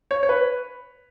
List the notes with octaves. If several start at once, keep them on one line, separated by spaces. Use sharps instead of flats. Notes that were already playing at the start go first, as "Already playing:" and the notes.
C#5
C#5
B4